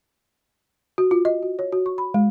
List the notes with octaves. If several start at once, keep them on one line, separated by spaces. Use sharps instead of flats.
F#4
F4
D#5
F#4
C#5
F#4
C#6
B5
G#3